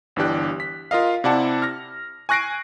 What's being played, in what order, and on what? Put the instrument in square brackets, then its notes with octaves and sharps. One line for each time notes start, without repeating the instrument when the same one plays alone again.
[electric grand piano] G1 E3 D4 G4 F#6
B6
F4 A#4 D#5 F5
C3 E4 D5 F#5 A5
F6 A#6
G#5 C#6 F#6 A#6 C7 D7